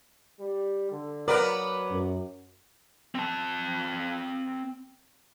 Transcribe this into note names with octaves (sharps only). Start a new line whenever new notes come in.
G3
D3
F#3 B3 A#4 D5
F#2
C4 A5